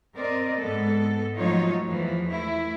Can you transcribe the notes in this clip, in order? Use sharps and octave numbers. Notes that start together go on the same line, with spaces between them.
C4 A#4 D5 D#5
G#2 B3 A4
F3 F#3 A3 D#4 F4 C#5
E2 E3 F3
A3 E4